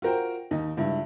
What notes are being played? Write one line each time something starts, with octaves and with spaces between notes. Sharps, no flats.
F4 F#4 A#4 C5 G5
D#2 D#4
C#2 G2 E4